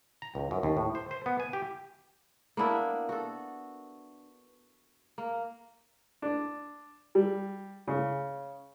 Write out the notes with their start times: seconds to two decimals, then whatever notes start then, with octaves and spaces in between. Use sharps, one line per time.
0.22 A#5
0.35 C#2
0.51 F#2
0.63 D#2
0.77 A2
0.95 C5
1.11 C5
1.26 B3
1.40 G#5
1.53 G4
2.57 A#3 B3 D4 E4
3.09 F#4 A4
5.18 A#3
6.22 D4
7.15 G3
7.88 C#3